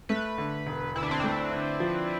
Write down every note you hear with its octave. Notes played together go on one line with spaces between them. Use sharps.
A3 B4
D3
E1
D2 E4
D4
C4
A3 D4
D3
F3